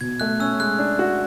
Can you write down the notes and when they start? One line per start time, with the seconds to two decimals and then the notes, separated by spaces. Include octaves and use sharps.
0.01 B2 G#6
0.20 A3 F#6
0.40 C#4 E6
0.60 G#3 F#6
0.79 D4
0.99 F#4